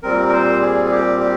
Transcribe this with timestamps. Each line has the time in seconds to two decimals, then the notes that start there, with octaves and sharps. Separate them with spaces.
0.03 A#2 G3 C4 A#4
0.28 A#4
0.33 C5
0.62 G#4
0.86 G#4
0.91 G4
1.20 G4